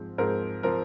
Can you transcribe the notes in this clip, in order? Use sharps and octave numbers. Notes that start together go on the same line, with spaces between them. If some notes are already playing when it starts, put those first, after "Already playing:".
Already playing: G#2 F3 C4
G#2 F3 C4 A#4
F3 C4 A#4